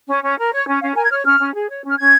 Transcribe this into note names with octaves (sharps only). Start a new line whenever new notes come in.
C#4
C#4
A#4
C#5
C#4
C#4 F5
A#4 G#5
G#6
C#5 F6
C#4 F6
C#4
G#4
C#5
C#4 F6
C#4 G#6